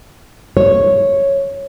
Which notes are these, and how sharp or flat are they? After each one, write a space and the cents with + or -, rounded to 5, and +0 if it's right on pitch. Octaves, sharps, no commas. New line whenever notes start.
C#5 -5